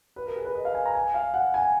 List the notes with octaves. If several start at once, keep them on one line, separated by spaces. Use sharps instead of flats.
B4
A#4
G#4
B4
D#5
F5
G#5
A#5
G#5
F5
F#5
G#5